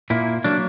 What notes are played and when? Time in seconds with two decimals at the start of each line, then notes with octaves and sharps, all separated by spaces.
0.10 A#2 A#3 E4
0.44 F#3 A#3 D4